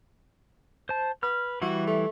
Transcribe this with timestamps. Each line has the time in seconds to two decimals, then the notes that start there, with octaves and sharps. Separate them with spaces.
0.89 C5 A5
1.23 B4 F6
1.62 E3 G3 E4 F#4
1.87 A3